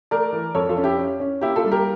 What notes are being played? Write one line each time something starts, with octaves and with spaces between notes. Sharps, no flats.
A3 A#4 D5
E3
F2 A4 C#5
F4 A4
C#4
E4 G4
C#4
C#4
A#3 E4 G4
F4 A4
G3
G4 A#4